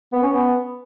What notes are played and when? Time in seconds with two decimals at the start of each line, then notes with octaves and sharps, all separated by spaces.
0.13 B3
0.23 C#4
0.33 B3